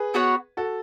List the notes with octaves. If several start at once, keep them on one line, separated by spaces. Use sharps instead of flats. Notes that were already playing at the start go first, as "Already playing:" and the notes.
Already playing: G#4 B4
B3 F#4 C#5 F#5
F#4 A4